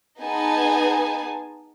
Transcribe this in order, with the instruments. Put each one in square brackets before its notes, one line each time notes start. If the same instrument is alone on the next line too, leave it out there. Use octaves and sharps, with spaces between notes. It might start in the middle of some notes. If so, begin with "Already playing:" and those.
[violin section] B3 D#4 G#4 G#5 A5